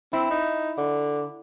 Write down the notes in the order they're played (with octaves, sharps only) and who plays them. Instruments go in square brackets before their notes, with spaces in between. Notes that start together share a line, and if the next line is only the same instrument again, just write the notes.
[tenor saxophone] C4 [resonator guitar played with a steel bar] E4
[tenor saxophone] D#4
D3